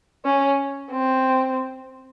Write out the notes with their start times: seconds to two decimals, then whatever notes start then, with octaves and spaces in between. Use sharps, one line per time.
0.25 C#4
0.92 C4